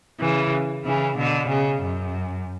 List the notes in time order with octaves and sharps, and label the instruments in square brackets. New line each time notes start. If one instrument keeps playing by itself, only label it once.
[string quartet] C#3 E3
C#3 E3
B2 D3
C#3
F#2